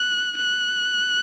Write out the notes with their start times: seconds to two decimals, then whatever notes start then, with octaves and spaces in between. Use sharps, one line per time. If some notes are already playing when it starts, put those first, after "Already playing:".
Already playing: F#6
0.37 F#6